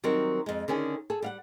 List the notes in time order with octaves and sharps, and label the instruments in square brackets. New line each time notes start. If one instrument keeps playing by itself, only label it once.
[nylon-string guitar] D#3 F#3 G3 C4 A#4
F2 G#3
D3 D#3 C#4 G#4
G#4 A4
G3 F5 F#5